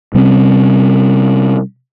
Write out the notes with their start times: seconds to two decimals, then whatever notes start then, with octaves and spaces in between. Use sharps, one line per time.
0.15 C3 G3 C4 C#4